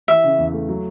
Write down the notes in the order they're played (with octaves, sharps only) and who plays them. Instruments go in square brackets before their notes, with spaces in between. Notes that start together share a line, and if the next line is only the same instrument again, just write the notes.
[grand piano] E3 [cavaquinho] E5
[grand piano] C#3
E2
A3
F#3